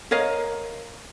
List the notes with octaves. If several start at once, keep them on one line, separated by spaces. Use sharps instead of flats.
A#4 C#5 D#5 F5